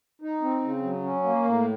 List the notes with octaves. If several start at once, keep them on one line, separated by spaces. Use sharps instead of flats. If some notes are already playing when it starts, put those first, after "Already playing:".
D#4
C4
C#3
F#3
C#4
A#3
A2